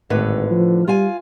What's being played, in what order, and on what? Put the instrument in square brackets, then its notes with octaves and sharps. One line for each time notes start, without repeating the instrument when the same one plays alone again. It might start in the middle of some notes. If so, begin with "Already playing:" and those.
[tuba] G#1 [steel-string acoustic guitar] A2 D3 B4
[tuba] F3
[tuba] G3 [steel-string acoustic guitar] F4 F5 G#5